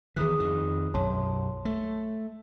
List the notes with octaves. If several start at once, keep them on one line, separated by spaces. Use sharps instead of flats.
E2 D#3 E3 G#4 D#6 F#6
F2 D#3
B1 F#2 C#5 A5 C6
A3